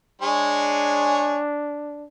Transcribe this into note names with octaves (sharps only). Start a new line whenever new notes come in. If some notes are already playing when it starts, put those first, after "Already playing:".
G#3 D4 G#4 C#5